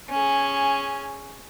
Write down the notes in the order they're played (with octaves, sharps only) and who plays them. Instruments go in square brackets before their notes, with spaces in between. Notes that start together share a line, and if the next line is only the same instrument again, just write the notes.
[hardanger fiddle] C#4 G#4